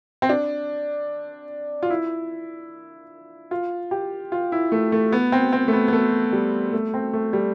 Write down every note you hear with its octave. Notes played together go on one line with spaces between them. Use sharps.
C4
D4
F4
E4
F4
G4
F4
E4
A3
A3
B3
C4
C4
A3
B3
B3
A3
G3
A3
C4
A3
G3